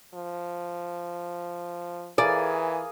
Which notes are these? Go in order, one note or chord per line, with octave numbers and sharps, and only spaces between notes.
F3
E3 G#4 A#4 D5 F5